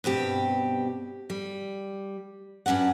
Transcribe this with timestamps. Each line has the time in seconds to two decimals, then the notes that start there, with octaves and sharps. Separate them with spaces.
0.04 G2 B2 C4 G4
1.30 G3
2.66 G2 F#3 C#4 D5 F#5